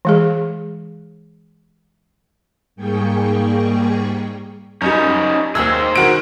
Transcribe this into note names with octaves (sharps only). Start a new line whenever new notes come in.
E3 G#3 G#4
G#2 G3 A#3 G#4 G5 C#6
F#2 G3 C#4 D#4 C#5
D#2 G#4 C5 E6
D#3 F#4 D7